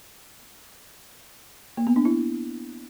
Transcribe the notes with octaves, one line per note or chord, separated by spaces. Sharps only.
A#3
B3
D4
E4